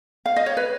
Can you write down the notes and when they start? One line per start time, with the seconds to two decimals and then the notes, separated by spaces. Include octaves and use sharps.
0.26 F5
0.36 D#5
0.46 C#5
0.57 B4